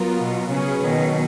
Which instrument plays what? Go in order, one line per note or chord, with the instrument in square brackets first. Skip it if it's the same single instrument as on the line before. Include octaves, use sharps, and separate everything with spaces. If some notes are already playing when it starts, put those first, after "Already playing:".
Already playing: [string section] F#3 B3 F4 A#4
[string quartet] B2
[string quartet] C#3 [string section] F#3 C#4 G#4 B4
[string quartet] B2 D#3